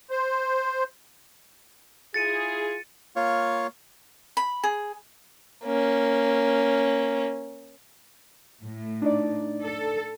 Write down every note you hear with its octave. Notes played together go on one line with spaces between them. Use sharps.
C5
E4 F4 G#4 A6 C#7 D#7
A#3 F4 C#5 F5 C#6
B5
G#4
A#3 C#4
A2
D4 D#4 D5
A4